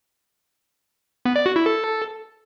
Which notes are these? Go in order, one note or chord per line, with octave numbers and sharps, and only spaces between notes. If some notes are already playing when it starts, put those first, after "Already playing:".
B3
D5
F#4
E4
A4